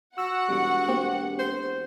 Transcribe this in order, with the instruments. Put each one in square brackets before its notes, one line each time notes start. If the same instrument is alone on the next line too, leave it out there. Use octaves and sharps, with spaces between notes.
[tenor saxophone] F#4 [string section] F#5 [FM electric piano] E6
[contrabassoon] E1 [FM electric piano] G3
[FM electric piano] A#3 C4 G4
[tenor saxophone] C5